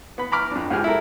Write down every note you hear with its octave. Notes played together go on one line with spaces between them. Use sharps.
B3 B5
A#5 B5 D6 F6
F2 D4
C#2 F3 G4 G#4 F6
E4 A4 A#4